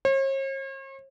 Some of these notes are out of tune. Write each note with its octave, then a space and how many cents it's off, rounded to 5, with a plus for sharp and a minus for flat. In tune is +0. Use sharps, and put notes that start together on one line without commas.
C#5 -45